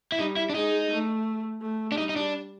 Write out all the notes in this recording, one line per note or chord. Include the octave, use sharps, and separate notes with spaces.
E4
G3 D#4
E4
D4
G#3 D#4
A3
A3
D4
G3 D#4
D#4
D4